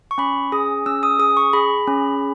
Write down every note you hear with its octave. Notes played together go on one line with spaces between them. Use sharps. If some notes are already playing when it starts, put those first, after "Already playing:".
C#6
C#4 B5
G#4 D#6
C#4 E6
D#6
G#4 D#6
C#6
G#4 B5
C#4